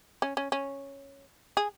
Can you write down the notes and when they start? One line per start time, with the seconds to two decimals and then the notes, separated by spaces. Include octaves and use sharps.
0.22 C#4
0.37 C#4
0.52 C#4
1.57 G#4